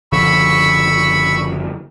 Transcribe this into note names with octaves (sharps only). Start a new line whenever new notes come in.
F#1 D3 F3 B5 C#6 E6